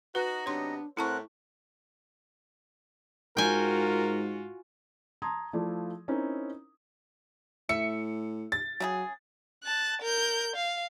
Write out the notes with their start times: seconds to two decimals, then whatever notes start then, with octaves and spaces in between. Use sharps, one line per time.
0.15 D#4 F#4 B4 D#5
0.46 C3 F#3 B3 D4 C#5 C6
0.97 A2 C4 E4 A#4 F#5 A5 C#6 F#6
3.37 G#2 F4 F#4 A#4 G5 G#5
5.22 A5 A#5 C6 D#6 G#6
5.53 F3 A3 E4 F4 D5
6.08 C4 C#4 D#4 E4 A#4
7.69 A2 E5 C#7
8.52 A6
8.80 C#3 F#3 D#4 G#4
9.64 A5 F#6
10.02 A#4 G6
10.56 F5